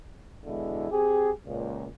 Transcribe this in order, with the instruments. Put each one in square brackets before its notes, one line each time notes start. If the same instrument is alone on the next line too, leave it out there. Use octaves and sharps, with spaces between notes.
[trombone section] E2 B2 D3 G#3 E4
C4 G4 G#4
C#2 A#2